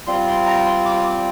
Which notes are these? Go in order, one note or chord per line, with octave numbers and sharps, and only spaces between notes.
G3 C4 F4 C6
C6
A#5
C6
D6
D6